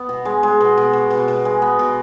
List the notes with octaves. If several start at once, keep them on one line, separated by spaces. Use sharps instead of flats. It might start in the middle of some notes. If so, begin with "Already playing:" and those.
Already playing: B3
B2
G#3
G#3
B2
B2
B2
B2
B2
G#3
B3
B2